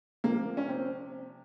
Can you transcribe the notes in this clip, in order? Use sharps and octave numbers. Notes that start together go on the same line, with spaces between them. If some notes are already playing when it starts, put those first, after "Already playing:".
C3 F3 A#3
C#4
C4